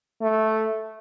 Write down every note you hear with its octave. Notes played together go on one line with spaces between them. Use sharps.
A3